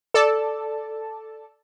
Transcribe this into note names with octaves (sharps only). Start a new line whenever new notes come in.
A4 D5 A5